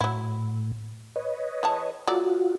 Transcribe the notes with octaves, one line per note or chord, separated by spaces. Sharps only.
A2 F#3 E4
B4 C#5 D#5
E3 G#4 A5
F#3 A3 F4 F#4 D5